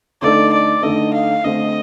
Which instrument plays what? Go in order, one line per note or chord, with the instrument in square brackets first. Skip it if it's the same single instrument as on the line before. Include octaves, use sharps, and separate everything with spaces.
[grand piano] D3 A3 D#4 A4 [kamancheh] D5
[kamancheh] D5
[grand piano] D3 A3 D#4 A4 [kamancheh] D#5
[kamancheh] F5
[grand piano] D3 A3 C4 [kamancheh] D#5